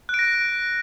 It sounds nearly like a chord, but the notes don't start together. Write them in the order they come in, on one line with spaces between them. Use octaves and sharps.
F#6 D7 A#6